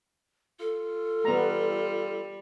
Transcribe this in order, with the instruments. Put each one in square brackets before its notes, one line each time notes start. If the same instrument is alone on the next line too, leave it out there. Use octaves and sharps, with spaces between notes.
[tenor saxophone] F4 [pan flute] A4
[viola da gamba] G3 [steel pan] B3 A#5